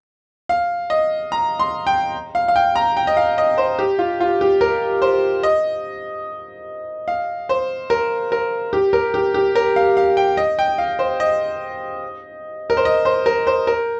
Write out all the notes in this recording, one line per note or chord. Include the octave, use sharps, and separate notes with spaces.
F5
D#5
A#5
C6
G5
F5
F5
G5
A#5
G5
D#5
F5
D#5
C5
G4
F4
F4
G4
A#4
C5
D#5
F5
C5
A#4
A#4
G4
A#4
G4
G4
A#4
F5
F5
G5
D#5
G5
F5
C5
D#5
A#4
C5
D#5
C5
A#4
C5
A#4